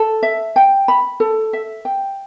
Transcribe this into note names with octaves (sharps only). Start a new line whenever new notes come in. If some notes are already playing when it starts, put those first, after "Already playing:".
Already playing: A4
E5
G5
B5
A4
E5
G5